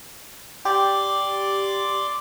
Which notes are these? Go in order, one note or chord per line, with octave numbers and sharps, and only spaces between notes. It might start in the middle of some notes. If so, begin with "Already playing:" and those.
G4 D5 C6 D6